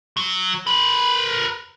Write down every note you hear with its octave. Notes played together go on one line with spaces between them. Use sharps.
F#3
A#4 B4